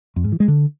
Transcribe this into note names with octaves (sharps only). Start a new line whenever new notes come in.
F2
G#2
E3
G#3
D3